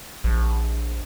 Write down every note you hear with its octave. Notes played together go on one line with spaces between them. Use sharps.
A#1